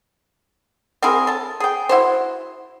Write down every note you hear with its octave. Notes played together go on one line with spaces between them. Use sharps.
C4 E4 G#4 A#4
A4 A5
G#4 G5
E4 F#4 C5